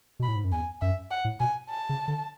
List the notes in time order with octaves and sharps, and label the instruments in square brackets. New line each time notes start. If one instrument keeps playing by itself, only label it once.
[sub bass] B2
[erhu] B5
[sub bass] A2
G#2
F#2
[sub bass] E2 [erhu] G#5
[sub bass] F#2 [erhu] E5
[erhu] F#5
[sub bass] A2
[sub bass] B2 [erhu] G#5
[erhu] A5
[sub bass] C#3
D3